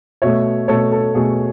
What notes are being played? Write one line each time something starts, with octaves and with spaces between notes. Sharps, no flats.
B2 A3 C#5 E5
B2 A3 A4 C#5
A4
B2 A3 G#4